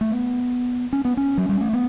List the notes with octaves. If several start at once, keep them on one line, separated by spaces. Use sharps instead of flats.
A3
B3
C#4
B3
C#4
F#3
G3
A3
B3